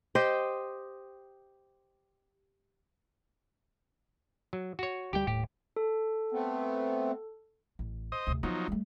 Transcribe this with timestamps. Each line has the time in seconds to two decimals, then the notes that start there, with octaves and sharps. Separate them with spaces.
0.15 G4 C5 D#5 G5
4.53 F#3
4.79 F#4 C#5
5.13 D2 G3 G4 G5
5.27 D#1 A2 G4
5.76 A4
6.32 A3 B3 C4
7.79 A1
8.12 C5 D#5 D#6
8.27 D2 C3
8.43 F3 F#3 B3 D#4
8.68 G3 A3